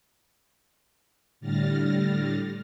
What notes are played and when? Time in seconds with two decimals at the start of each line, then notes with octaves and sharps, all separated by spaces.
1.40 A2 D3 G3 F6 A6 A#6